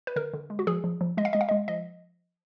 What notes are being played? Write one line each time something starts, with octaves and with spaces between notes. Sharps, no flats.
B4
D3 A#4
D3
G#3
F#4
F3 G#4
F3
F3
G#3 D#5
F5
G#3 D#5
F5
G#3 D#5
F3 D#5